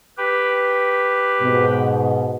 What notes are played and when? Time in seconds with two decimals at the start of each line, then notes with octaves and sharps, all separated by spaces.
0.18 G4 B4
1.42 G#2 B2